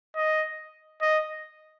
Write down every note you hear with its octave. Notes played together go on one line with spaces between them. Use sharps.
D#5
D#5